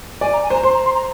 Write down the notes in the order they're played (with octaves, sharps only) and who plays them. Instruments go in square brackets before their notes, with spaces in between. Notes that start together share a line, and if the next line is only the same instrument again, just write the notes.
[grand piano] D5 [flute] G#5
[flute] A#5
G#5
[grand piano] C5 [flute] A#5
[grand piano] C5 [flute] C6
[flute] A#5
C6
A#5